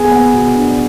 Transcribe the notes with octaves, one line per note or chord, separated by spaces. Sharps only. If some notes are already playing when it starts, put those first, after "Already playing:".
Already playing: B3 G#4
B3
B2
D4